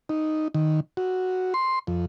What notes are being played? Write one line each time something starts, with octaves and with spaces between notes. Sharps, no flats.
D#4
D#3
F#4
C6
F2